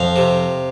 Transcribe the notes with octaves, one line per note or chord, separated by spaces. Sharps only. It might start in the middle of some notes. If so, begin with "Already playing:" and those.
Already playing: F2 F5
C3